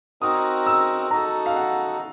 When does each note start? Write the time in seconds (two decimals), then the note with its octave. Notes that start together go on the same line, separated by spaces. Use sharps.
0.22 C4 D#4 F#4 A#4 D#6
0.66 E6
1.11 D#4 F#4 A4 A#5
1.46 F5
1.56 F#5